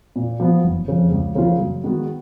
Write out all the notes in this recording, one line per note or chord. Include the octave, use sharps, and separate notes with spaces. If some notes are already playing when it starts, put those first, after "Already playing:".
A#2
F3 B3
F#1
F2 C#3
C#2
C#3 F3 A#3 F4
F#2
D#3 G#3 B3 F#4